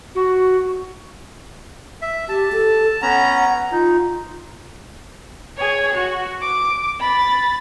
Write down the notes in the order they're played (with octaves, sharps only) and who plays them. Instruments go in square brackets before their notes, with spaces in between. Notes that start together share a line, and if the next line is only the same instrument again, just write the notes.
[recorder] F#4
[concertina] E5
[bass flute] G4 [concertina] A5
[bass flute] A4
[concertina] B3 C#4 A#5 [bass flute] F#5
[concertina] D#4 [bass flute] F4
[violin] G#4 C#5
F#4
D6
B5 A6